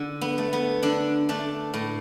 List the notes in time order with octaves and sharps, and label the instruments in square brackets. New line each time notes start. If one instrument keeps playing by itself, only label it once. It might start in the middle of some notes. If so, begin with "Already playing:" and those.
Already playing: [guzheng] D3
B3
A3
B3
D3 D4
A3 D4
A2